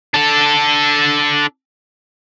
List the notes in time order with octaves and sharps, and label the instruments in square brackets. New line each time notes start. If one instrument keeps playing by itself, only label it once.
[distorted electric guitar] D4 A4